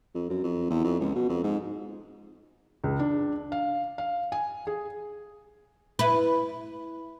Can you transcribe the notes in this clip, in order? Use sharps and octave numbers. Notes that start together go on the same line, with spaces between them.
F2
F#2
F2
E2
F2
C#2
B2
F2
G#2
C#2
D4
F5
F5
G#5
G#4
E4 B4